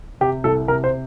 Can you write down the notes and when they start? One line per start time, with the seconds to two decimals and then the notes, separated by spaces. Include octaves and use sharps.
0.21 C3 G4
0.44 C2 A4
0.68 C3 A#4
0.84 C5